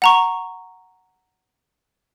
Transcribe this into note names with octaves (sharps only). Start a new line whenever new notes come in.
F#5 A#5 C#6